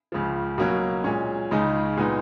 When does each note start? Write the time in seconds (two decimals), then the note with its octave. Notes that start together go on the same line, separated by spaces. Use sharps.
0.12 C#2 C#3 F3
0.58 B2 F#3 A#3 C#4
1.04 A#2 G#3 C#4
1.51 C#2 C#3 G#3 D#4
1.97 A#2 G#3 B3 D#4